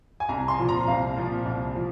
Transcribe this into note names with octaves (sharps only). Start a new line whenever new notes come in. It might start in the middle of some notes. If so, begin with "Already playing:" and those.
G#5
C2 A#5
C6
A#2 F3
A#5
C2 F5
A#2 F3
C2
F3